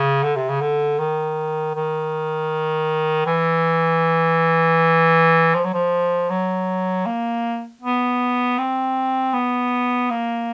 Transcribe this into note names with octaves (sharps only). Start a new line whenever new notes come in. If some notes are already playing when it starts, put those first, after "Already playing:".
Already playing: C#3
D3
C3
C#3
D3
D#3
D#3
E3
F3
F#3
F3
F#3
A#3
B3
C4
B3
A#3